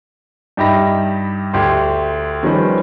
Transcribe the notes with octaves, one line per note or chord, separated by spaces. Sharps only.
G2 D#4 G4 E5 B5 A#6
D2 G4 C6
D#3 F3 G3 C#4 B4 C5